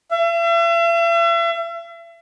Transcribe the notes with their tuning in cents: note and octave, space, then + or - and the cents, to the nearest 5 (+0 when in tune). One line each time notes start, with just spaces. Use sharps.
E5 +40